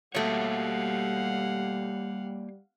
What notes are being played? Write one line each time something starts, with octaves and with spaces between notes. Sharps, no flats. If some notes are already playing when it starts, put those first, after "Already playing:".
B2 G3 A3 A#3 G4 C#5 F5 F#5